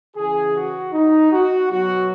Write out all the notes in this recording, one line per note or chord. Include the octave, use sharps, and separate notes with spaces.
C#3 E3 G#4
F#4
D#4
F#4
B2 F#3 F#4